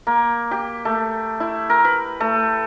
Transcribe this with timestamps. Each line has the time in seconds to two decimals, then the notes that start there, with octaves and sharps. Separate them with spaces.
0.07 A#3
0.51 G4
0.85 A3
1.40 E4
1.70 A#4
1.85 B4
2.20 A3